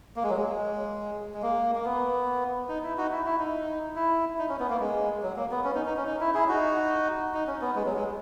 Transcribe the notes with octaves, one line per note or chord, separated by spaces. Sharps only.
A#3
G#3
F#3
G#3
G#3
A#3
A#3
B3
D#4
E4
D#4 F#4
E4
E4
D#4
E4
D#4
C#4
B3
A#3
G#3
F#3
A#3
B3
C#4
D#4
D#4
C#4
D#4
E4
E4 G#4
D#4 F#4
D#4
C#4
B3
G#3
F#3
G#3